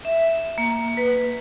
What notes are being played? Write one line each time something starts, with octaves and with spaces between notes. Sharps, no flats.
E5
A#3
B4